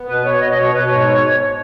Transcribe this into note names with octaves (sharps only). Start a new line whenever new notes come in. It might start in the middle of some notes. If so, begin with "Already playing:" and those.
Already playing: B3
B2 B4
B2 C#5
B2 D#5
D#5
B2 C#5
B2 B4
G#2 C#5